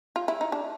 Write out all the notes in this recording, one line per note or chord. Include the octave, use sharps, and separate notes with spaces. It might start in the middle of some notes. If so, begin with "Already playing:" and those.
F4
E4
D#4
D4